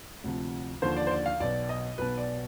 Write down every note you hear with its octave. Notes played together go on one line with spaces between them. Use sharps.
D2 C3 F3
D#2 D3 F3 C5
D5
C5
D5
F5
B1 B2 D5
D#5
B1 B2 B4
D5